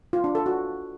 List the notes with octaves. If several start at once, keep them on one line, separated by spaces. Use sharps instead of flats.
F4
D4
A4
F#4